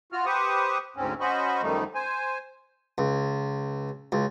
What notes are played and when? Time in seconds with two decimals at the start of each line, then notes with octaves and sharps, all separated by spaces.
0.12 F4 F#4 F6
0.26 G4 B4 C5 C#6 D#6
0.96 D2 G#2 C4 C#4
1.21 C#4 F#4 C5 D#5 B5 C#6
1.62 F#2 D#3 F3 G3 A3 D#4
1.95 C5 G#5
2.98 C#2
4.12 C#2